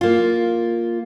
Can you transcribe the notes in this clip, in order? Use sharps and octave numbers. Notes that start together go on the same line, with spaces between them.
A#3 F4